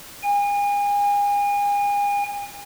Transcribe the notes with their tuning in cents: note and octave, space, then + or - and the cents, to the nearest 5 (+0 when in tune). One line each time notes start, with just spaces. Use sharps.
G#5 -35